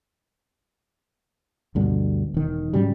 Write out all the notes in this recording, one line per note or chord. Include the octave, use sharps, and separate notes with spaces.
D2 G2 B2 D3
E1 D#3
G#2 C#3 F#3 G3